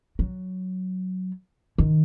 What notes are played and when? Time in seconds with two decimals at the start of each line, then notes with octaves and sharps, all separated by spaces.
0.19 F#3
1.78 D#3